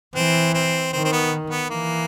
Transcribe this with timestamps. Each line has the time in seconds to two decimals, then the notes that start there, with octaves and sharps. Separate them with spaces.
0.16 E3 C4
0.54 C4
0.93 D#3 C4
1.05 C4
1.12 B3
1.51 B3
1.70 E3 A#3